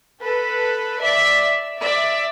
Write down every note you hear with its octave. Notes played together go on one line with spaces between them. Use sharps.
A4 B4
D5 E5
D5 E5